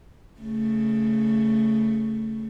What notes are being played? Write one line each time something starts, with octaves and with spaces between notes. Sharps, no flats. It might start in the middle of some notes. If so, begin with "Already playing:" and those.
C#3 A3